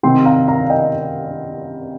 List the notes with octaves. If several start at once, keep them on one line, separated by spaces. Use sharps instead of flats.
C3 D#3 C4 G5 C6
F5 A#5
F5 A#5
F5
D#5 G5